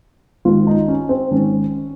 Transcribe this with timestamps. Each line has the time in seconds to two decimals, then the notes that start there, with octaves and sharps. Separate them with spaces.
0.45 G#1 G#2 D#3 F4
0.67 D#4
0.88 C#4
1.09 C4
1.31 G#1 G#2 D#3 C#4